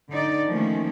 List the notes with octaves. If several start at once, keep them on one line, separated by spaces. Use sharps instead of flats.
D3 D#4 D5
D#3 F3 A3 A#3 C#4